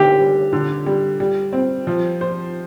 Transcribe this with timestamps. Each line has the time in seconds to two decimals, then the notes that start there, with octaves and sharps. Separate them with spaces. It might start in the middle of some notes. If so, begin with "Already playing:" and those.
Already playing: D3 G4
0.19 G3
0.53 D3
0.86 G3
1.20 G3
1.53 C4
1.87 F3
2.21 C5